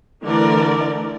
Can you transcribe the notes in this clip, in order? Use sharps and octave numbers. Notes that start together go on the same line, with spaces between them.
D3 E3 A3 E4 A#4 D5